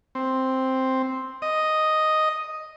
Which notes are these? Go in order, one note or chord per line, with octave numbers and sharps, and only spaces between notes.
C4
D#5